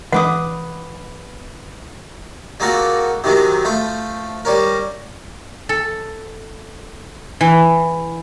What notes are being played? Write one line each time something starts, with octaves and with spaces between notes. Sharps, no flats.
E3 G#3 D4 B4 F#5 D6 D#6
G#3 A#3 C4 F4 F#4 A4
C3 D#3 F#3 G#3 C4
F3 A3 C5
G3 C#4 A#4
A4
E3